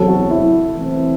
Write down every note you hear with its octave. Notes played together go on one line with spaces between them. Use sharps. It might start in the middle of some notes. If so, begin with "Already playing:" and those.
Already playing: E2 C3 F#3 C4 A4
F#4
E4
E3 A3 C4